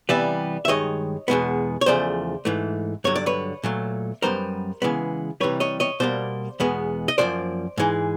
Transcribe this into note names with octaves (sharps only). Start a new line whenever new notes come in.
C3 E3 G3 B3 D5 E5
E5
G2 D#3 G#3 C#5 D#5
E2 B2 G#3 B3
C#5
E2 C#3 F3 A3 C5 D5
G#2 E3 A3
G2 D3 F#3 C#5
D5
B4 C#5
A#2 F#3 A3
F#2 D3 G3 B3 A#4 C5
C#3 E3 G#3 B3
C3 E3 G3 B4 C#5
C#5 D#5
C#5 D#5
B2 G3 A#3 C5 D5
E2 B2 G#3 B3
D#5
F#2 D3 F3 A#3 C5 D5
G#2 E3 G#3